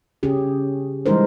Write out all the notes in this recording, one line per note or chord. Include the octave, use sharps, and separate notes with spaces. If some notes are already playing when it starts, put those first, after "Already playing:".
C#3 C#4 G4 G#4
E3 G3 G#3 D#4 A#4 C5